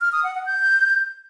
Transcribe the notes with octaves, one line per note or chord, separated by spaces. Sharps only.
F6
D#6
F#5
F#5
G6